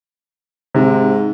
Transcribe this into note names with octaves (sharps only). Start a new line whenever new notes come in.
G#2 C3